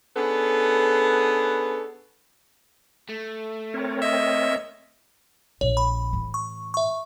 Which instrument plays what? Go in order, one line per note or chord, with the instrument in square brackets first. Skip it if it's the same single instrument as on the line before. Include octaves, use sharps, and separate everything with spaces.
[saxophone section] B3 C#4 D4 G#4 A4 B4
[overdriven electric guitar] A3
[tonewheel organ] C4 A#4 C#5
[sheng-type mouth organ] D#5 [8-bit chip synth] E5
[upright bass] A#1 [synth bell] C#5
[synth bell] B5
[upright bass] A2 E3
[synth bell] C#6
E5 C#6